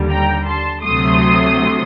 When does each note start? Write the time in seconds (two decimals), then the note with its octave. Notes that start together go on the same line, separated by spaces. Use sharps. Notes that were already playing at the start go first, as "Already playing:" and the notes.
Already playing: D#2 D3 G3
0.10 G5 A#5
0.47 A5 C6
0.82 D2 C3 F#3 A3 C6 D#6